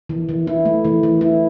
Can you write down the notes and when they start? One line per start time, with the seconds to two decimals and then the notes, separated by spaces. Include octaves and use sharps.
0.09 E3
0.29 E3
0.47 E4
0.65 A3
0.85 E3
1.03 E3
1.21 E4